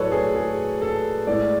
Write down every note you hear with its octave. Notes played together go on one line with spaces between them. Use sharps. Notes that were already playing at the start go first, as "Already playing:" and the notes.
Already playing: A2 F#3 A4 B4 C#5 D5
G#4
G#4
A4
A2 G#3 D5